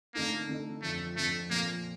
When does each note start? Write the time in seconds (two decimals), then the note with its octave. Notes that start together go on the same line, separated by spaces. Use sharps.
0.14 D3 A3 A#3 D#4 A4
0.49 D3 A3 D#4 A4
0.82 F2 D3 F3 A3
1.17 F2 D3 F3 A3
1.50 A#2 F3 A#3 C4 F4